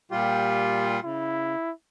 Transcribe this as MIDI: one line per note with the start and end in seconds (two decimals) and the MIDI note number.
0.11 1.00 46
0.11 1.00 55
0.11 1.00 65
0.11 0.86 67
1.03 1.56 49
1.03 1.71 64